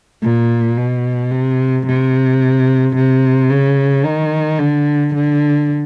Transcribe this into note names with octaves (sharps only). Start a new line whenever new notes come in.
A#2
B2
C3
C3
C3
C#3
D#3
D3
D3